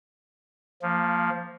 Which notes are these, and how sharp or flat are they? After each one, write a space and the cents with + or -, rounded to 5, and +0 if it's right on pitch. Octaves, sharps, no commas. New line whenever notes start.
F3 +0 A#3 -25